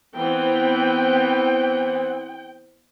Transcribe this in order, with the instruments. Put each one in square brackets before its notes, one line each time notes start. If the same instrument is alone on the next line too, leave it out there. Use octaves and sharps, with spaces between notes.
[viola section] E3 B3 C4 [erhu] G5